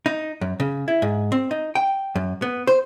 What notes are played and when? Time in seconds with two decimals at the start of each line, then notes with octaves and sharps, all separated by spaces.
0.06 D#4
0.41 F#2
0.60 C#3
0.88 E4
1.02 G#2
1.32 C4
1.51 D#4
1.75 G5
2.16 F#2
2.42 B3
2.67 C5